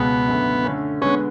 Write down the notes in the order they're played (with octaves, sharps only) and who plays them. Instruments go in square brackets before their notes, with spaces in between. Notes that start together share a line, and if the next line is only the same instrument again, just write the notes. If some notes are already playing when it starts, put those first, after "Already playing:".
Already playing: [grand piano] C#2 B2 G#3 [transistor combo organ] B3
[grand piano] F#2 D3 A3
D3 A3 C#4
[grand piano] D3 G#3 B3 [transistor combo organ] C#4